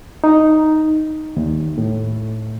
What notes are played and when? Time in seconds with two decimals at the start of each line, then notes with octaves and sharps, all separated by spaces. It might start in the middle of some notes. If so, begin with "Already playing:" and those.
0.24 D#4
1.37 D#2
1.78 A2